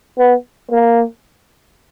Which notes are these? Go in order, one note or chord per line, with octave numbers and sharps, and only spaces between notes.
B3
A#3